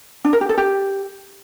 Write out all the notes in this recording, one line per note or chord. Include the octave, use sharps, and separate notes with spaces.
D4
A#4
G4
A4
G4